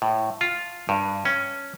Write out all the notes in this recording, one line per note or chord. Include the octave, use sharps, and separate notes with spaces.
A2
F4
G2
C#4